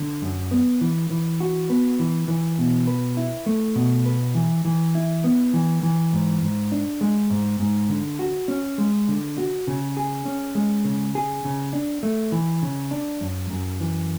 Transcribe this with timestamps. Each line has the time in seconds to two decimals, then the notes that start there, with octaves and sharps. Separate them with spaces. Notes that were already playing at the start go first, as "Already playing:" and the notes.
Already playing: D3
0.22 F#2
0.51 B3
0.81 E3
1.10 E3
1.40 F#4
1.70 B3
1.99 E3
2.28 E3
2.59 B2
2.87 B4
3.17 E4
3.46 A3
3.76 B2
4.06 B4
4.35 E3
4.65 E3
4.95 E4
5.24 B3
5.54 E3
5.83 E3
6.13 G#2
6.42 G#2
6.72 D4
7.01 G#3
7.30 G#2
7.60 G#2
7.89 D3
8.19 F#4
8.48 C#4
8.78 G#3
9.08 D3
9.38 F#4
9.67 C#3
9.97 G#4
10.25 C#4
10.55 G#3
10.85 C#3
11.15 G#4
11.45 C#3
11.73 D4
12.03 A3
12.32 E3
12.62 C#3
12.91 D4
13.21 F#2
13.50 F#2
13.80 E3